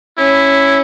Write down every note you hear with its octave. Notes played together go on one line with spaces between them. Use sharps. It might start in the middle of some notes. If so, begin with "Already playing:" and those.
C#4 E4